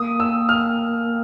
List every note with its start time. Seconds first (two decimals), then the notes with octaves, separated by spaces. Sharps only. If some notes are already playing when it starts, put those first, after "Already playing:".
Already playing: A#3 D#6
0.20 E6
0.49 F6